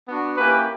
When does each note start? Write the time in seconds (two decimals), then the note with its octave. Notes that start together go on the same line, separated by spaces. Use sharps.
0.09 B3 D4 F#4
0.37 A#3 C#4 E4 G4 B4